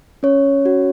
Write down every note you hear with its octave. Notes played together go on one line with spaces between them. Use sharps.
C#4 C#5
F#4